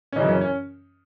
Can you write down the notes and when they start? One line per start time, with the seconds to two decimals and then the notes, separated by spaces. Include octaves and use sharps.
0.13 C#4
0.16 F#2 C#3 E3 D#4
0.28 C#4
0.41 C#4